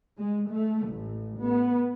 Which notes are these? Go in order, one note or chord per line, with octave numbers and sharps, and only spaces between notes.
G#3
A3
A1
B3